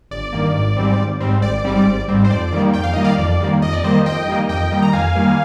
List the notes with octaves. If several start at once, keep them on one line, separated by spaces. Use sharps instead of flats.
G1 D5
G2 D#3 A#3
G#1
G#2 G3 C4
G#1
G#2 G3 C4
G#1 D5
G#2 G3 C4
G#1
G#2 G3 C4
C5
F2 D5
D#3 G3 A#3
F2 G5
F5
D#3 G3 A#3 D#5
D5 F5
F2 D5
D#3 G3 A#3
F2 D#5
D5
D#3 G3 A#3 C5 D#5
F2 D#5 G5
D#3 G3 A#3
F2 D#5 G5
D#3 G3 A#3
A#5
F2 F5 G#5
D#3 G3 A#3